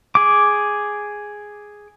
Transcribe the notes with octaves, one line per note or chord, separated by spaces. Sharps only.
G#4 D6